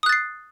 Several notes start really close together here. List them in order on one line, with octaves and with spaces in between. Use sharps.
D#6 F#6 A6 C7